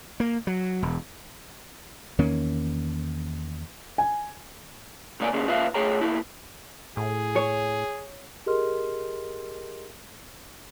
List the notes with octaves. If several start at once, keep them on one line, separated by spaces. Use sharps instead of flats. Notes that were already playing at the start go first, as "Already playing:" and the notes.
A#3
F#3
E1
E2 D#3 A#3 C#4
G#5
A2 C#3 A#3 D5 F#5 G#5
D3 A#3 C4 C#4 G#4
C#3 A#3 F4 B4 E5 F5
A3 G#4 C#5 G5 A#5
E2 A#3 E4
A2 G#4
C#5
G4 G#4 A#4 D#5 C6 F6